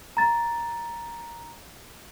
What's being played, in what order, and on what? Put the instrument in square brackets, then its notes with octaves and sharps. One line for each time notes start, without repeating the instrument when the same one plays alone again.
[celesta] A#5 A6